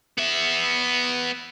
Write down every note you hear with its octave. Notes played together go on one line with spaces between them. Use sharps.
B3 E5